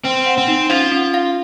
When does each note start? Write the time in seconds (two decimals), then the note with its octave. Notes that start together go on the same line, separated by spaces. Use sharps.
0.04 C4 C5
0.26 F#5
0.38 C4
0.48 D#4
0.69 C#4 F4
0.92 C#4
1.14 F5